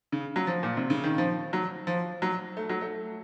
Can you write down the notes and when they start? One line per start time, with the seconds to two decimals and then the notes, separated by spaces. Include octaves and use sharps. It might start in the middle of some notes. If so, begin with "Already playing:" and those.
0.12 C#3
0.36 F#3
0.47 F3
0.63 A#2
0.77 C3
0.90 C#3
1.04 D#3
1.18 F3
1.53 F#3
1.87 F3
2.22 F#3
2.57 A3
2.69 F#3
2.81 A3